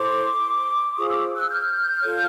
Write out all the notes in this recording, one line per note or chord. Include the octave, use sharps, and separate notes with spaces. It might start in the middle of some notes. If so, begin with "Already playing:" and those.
Already playing: E4 A4 C5 C6 D6
F4 G#4 C5 C#6 D#6
D6 E6
E6 F#6
F6 G6
F4 A4 C#5